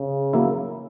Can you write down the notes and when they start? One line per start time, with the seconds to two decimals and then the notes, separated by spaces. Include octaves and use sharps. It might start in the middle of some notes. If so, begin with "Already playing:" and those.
Already playing: C#3
0.33 F#3 A#3 E4